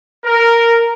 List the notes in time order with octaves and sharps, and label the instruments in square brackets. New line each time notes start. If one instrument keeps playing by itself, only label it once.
[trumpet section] A#4